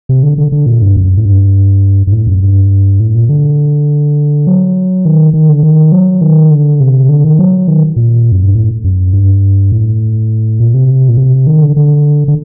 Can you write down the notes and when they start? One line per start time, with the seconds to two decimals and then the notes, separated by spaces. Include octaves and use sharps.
0.09 C3
0.23 D3
0.38 D3
0.52 D3
0.66 A#2
0.82 G2
0.96 F#2
1.17 A2
1.25 G2
2.07 G2
2.12 A2
2.27 F#2
2.42 G2
3.00 A2
3.15 A#2
3.29 D3
4.47 F#3
5.05 D#3
5.33 D#3
5.49 D3
5.63 D#3
5.92 F#3
6.21 D#3
6.51 D3
6.80 C3
7.09 D3
7.24 D#3
7.39 F#3
7.68 D#3
7.96 A#2
8.32 F#2
8.43 G2
8.55 A2
8.84 F#2
9.13 G2
9.72 A2
10.60 A#2
10.74 C3
11.09 A#2
11.17 C3
11.47 D#3
11.61 D3
11.76 D3
12.28 D3